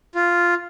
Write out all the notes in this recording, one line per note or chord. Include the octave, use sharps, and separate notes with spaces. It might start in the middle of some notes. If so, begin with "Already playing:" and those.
F4